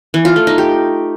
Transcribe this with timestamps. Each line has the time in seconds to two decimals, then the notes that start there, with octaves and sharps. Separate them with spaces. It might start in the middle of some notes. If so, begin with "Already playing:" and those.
0.14 E3
0.25 F4
0.36 A3
0.47 D#4
0.58 G4